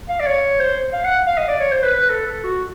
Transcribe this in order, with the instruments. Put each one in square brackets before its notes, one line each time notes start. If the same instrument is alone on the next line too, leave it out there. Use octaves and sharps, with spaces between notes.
[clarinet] F5
D5
C#5
C5
F5
F#5
F5
D#5
D5
C#5
C5
B4
B4
A4
A4
F#4